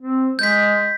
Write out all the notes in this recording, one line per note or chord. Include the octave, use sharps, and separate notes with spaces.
C4
G#3 G6 B6